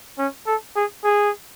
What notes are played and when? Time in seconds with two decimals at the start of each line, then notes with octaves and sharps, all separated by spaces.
0.18 C#4
0.47 A4
0.76 G#4
1.04 G#4